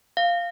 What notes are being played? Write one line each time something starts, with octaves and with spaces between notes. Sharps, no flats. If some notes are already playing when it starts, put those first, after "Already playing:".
F5